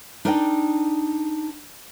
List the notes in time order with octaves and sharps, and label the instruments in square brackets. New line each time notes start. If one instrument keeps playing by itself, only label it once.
[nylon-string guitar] D4 D#4 A#4 D5 E5 G5